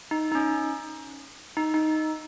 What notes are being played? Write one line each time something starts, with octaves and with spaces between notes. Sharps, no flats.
D#4
D#4
C#4
D#4
D#4